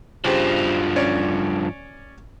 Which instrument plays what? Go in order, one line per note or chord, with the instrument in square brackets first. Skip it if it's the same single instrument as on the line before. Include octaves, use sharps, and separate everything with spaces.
[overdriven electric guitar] G2 F3 [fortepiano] C#3 G4 C5
[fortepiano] C#4 C#5 D5